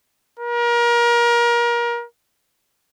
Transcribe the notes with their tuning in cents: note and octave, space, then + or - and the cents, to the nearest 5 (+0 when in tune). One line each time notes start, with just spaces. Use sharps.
A#4 +30